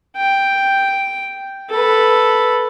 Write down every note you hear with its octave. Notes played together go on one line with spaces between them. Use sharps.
G5
A4 B4